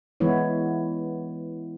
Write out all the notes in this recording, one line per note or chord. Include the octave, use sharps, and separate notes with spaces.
E3 G#3 B3 E4 C#5